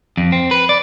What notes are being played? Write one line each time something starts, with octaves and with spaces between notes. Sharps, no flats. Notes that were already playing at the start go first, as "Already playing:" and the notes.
F2
C4
B4
D5